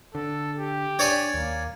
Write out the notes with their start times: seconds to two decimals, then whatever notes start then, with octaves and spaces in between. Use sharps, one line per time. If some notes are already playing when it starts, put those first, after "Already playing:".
0.15 D3 A4
0.59 G4
0.99 D4 C#5 D5 G#5
1.34 D#2 A#3